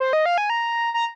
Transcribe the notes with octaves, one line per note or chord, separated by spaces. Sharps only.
C5
D#5
F5
G#5
A#5
A#5